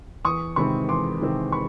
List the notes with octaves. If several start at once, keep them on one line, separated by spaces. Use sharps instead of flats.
E2 C#6 D#6
C3 D#3 G#3 C4 B5 C#6
E2 C6 D6
C3 D#3 G#3 C4
B5 C#6